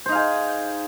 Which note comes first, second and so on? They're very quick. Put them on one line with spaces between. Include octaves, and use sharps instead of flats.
C5 D#4 F5 G#4